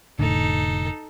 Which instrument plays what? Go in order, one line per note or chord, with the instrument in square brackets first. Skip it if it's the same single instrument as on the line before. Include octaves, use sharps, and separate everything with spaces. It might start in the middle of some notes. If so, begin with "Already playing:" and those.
[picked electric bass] F1 A2 D3 [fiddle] D#4 A4